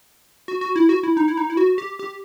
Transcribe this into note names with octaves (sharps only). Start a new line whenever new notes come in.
F#4
F#4
E4
F#4
E4
D#4
E4
D#4
E4
F#4
G4
G4